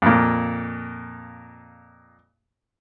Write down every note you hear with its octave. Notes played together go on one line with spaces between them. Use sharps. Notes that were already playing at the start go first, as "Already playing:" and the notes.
F2 A#2